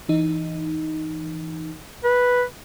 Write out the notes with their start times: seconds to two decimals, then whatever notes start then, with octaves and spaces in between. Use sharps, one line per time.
0.09 E3 D#4
2.04 B4